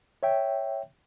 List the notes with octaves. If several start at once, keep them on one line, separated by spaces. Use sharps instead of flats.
C#5 E5 G5